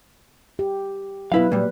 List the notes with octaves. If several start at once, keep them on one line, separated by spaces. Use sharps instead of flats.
G4
B2 F#3 E4 B4 F5
A#2 G3 B4